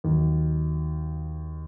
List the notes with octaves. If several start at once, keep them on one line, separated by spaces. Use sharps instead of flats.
D#2 D#3 F#3